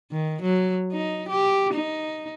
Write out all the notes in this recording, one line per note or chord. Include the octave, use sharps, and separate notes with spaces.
D#3
F#3
D#4
G4
D#4